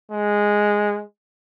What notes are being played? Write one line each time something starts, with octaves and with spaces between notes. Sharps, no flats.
G#3